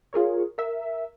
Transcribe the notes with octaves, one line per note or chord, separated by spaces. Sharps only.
F4 G#4 A#4 C#5
A#4 E5